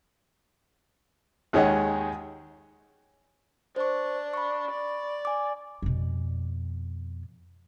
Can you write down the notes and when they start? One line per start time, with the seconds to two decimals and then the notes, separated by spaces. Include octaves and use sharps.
1.53 D#2 D#3 G#3 C#5 D#5 F#5
3.76 D4 C5 C#6
4.34 B5 C#6
4.71 D5
5.25 G#5 D6
5.82 F2 B2